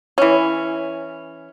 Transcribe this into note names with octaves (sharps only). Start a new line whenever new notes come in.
E3 C#4